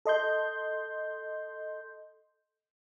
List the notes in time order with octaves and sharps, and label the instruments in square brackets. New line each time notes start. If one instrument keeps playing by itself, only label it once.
[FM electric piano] A4 D#5 C6 G6